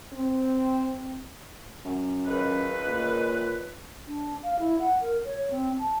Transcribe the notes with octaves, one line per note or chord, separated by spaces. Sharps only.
C4
F#2
C#2 D#3 B4
A#2
D4
F5
E4
F#5
A#4
C#5
C4
A5